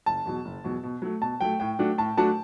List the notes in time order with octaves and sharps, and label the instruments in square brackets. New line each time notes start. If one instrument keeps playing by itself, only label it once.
[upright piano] F#1 [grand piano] A5
[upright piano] E2 B2 F#3
F#1
E2 B2 F#3
B2
F#3 A3
[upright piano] B2 [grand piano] A5
[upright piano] F#3 A3 [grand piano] G5
[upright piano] A2 [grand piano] G5
[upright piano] F#3 A3 D4 F#4
[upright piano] A2 [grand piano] A5
[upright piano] F#3 A3 D4 F#4 [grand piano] A5